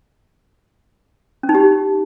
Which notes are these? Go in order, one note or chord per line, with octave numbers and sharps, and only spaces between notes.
C#4
D#4
G4